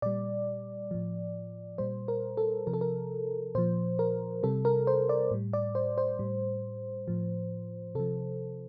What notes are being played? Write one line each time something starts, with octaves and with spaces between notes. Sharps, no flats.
A#2 G3 D5
A2 F3
A#2 G3 C5
A#4
A4
C3 F3 A#4
A4
A#4
A#2 F3 C5
A#4
C3 G3 A4
A#4
C5
D5
A2 G3
D5
C5
C5
A2 G3
A2 F3
C3 F3 A4